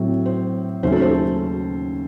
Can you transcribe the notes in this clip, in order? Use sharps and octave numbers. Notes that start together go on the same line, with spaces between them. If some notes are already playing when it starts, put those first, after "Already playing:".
Already playing: A2 F#3 C4
C5
D#2 C#3 F#3 A3 C#4 C5
A4
C5
A4